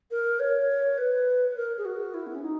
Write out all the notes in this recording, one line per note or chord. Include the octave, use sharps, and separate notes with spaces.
A#4
C#5
B4
B4
A#4
G#4
F#4
E4
B3
C#4
D#4